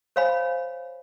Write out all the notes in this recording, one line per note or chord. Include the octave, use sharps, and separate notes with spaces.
C5 C#5 F5 G#5 B5